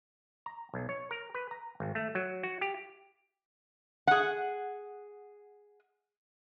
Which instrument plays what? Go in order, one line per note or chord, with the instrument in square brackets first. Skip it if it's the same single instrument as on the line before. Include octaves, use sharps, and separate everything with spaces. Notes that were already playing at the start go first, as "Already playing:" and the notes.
[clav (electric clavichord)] A#5
B1
C#5
A#4
B4
A#5
G#1
A3
F#3
F#4
G4
[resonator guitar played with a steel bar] G#4 F#5